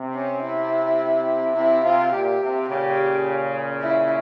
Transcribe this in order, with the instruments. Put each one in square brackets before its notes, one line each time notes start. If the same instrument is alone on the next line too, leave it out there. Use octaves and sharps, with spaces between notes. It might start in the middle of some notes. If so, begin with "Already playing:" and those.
Already playing: [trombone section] C3
[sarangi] C#4
E4
[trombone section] C3 [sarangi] E4
[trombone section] C3 [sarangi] F4
[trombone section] A#2 [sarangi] G4
[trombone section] C3
[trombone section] A#2 C#3 [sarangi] G4
[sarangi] E4